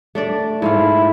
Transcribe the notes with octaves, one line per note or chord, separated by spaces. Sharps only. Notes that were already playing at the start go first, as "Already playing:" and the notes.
A3 D4 D5
G#2 A3 E4 F5